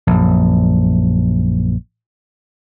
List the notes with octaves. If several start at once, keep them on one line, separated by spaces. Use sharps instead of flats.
A#1 F#2